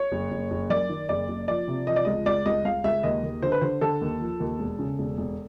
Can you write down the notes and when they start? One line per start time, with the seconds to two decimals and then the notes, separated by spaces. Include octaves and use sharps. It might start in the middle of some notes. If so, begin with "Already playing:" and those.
Already playing: C#5
0.12 F#1
0.31 F#1
0.51 F#1
0.70 F#2 D5
0.89 D#3
1.09 F#1 D5
1.28 F#1
1.48 F3 D5
1.68 C3
1.87 F3 D#5
1.96 D5
2.05 C#2 D#5
2.26 C#2 D5
2.46 C#2 D#5
2.65 C#2 F5
2.84 C#2 E5
3.03 D#2 D#5
3.23 D#2
3.42 D3 C5
3.52 B4
3.61 D3 C5
3.81 D3 A4
4.01 D#2
4.20 F3
4.40 D#2
4.59 E1
4.79 C#3
4.99 E1
5.18 E1